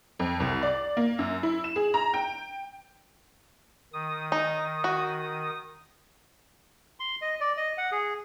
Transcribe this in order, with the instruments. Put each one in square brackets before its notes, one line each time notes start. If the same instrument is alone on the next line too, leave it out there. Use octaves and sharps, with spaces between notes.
[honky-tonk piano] F2
C2
D5
A#3
F#2
E4
E7
G#4
A#5
G5
[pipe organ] D#3 D#6
[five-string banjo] D#4
F#4
[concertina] C6
D#5
D5
D#5
F#5
G#4